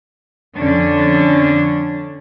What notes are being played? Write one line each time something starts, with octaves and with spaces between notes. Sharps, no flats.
F2 D3 C#4 D4